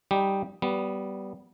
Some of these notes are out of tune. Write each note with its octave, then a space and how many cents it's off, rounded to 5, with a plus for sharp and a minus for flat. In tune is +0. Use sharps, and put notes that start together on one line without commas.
G3 +0 D#4 +0 G4 +0
G3 -15 B3 +0